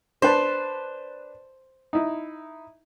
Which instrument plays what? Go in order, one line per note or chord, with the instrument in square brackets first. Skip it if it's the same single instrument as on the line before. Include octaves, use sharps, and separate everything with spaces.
[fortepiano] D4 B4 A5 [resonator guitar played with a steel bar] C5
[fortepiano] D#4 E4